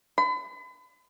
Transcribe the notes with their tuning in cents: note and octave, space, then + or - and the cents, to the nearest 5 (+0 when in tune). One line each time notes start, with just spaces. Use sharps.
B5 +40